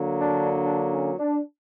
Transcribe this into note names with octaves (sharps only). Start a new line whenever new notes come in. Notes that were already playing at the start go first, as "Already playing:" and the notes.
Already playing: D3 F#3 A#3
D4
D4
C#4
D4